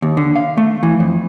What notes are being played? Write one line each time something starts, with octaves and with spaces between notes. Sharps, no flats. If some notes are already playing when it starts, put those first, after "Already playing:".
D#2
D3
F5
A3
E3
F2